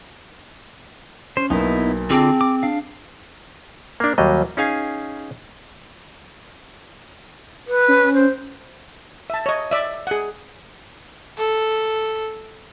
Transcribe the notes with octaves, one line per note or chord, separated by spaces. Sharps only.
C#4 C5
B1 A#3 B3 D#4 E4
D3 C4 F4 G#4 A5 D6
D6
D4 F5
A#3 D4
D#2 F#3 G3 D#5
C#4 D#4 G#4 F5 G#5
B4
C#4
C5
E5 A5
C#5 D#5
D5 E5
G#4 F#5
A4